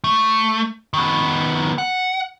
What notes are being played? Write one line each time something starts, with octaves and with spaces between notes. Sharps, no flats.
A3
D#3 B3
F#5